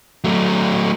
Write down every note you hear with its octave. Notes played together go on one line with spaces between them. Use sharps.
F#3 A3